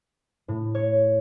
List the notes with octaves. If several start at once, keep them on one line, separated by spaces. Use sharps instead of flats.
A2
C#5